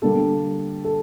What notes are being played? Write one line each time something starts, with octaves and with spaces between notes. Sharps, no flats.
D3 G3 A#3 A4
A4